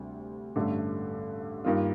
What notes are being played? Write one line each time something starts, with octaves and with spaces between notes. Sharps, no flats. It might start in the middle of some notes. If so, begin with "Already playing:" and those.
Already playing: D2 C3 G3
A1 G2 D3 A3
G2 D#3 A#3 F4